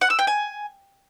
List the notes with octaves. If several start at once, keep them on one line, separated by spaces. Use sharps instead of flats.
F#5
E6
G5
G#5